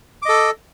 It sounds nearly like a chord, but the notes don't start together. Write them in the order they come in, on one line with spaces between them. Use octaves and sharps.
D6 D#5 A4